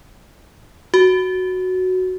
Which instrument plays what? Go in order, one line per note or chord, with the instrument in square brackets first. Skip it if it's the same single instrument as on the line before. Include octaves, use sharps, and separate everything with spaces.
[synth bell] F#4